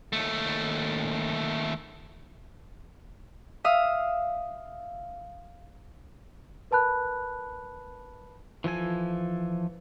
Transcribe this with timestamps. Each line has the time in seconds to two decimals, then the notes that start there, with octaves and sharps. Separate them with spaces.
0.13 D#2 A3
3.64 E5 F5 D#6
6.71 A#4 B4 A5 B5 F#6
8.64 E3 F3 A4 G#5